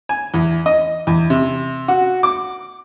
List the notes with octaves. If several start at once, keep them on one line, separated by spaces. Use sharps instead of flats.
G#5
E2
D#5
E2
C3
F#4
D6